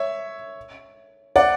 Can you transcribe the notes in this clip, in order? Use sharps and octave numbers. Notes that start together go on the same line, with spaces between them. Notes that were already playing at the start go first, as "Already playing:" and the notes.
Already playing: C#5 E5
D5 F#5